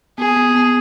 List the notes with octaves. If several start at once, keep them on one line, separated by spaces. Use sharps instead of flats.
B3 G#4
B3
B3